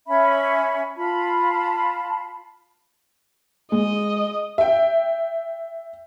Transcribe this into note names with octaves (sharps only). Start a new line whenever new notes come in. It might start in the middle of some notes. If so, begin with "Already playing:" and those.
C#4 E5 B5
F4 A5 B5
G#3 D#5
E5 G5